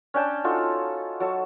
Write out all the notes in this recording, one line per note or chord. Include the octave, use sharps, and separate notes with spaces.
C#4 D4 G5 A5
D#4 F4 F#4 A4
F#3 A4